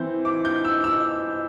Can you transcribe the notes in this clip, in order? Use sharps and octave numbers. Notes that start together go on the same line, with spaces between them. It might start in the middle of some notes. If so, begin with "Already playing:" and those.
Already playing: E3 C4 E4 G6
D6
G6
E6
E6